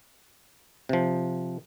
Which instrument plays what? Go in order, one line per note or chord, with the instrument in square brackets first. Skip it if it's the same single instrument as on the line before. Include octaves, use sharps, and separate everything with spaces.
[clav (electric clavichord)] C3 F3